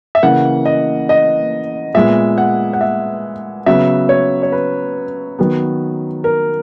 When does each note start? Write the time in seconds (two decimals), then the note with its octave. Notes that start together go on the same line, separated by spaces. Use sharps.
0.15 E5
0.22 C#3 E3 A#3 F#5
0.65 D#5
1.09 D#5
1.94 A#2 G#3 B3 E5
2.38 F#5
2.73 F#5
2.81 E5
3.66 C#3 F#3 B3 E5
4.09 C#5
4.43 C#5
4.52 B4
5.39 D#3 F#3 B3
6.24 A#4